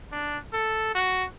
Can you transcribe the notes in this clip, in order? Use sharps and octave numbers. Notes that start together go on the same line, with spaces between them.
D4
A4
F#4